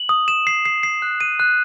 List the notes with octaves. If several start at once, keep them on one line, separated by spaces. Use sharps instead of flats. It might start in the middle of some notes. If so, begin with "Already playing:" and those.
Already playing: F#7
D#6
E7
C7
C7
C7
F#6
D#7
F#6